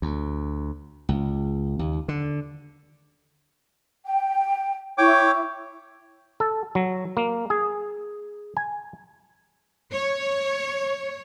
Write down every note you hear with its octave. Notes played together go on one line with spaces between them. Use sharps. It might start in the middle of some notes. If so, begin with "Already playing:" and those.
D2
C#2
D#2
D3
G5
E4 C#5 G5 C#6 D6
A4
F#3
A#3
G#4
G#5
C#5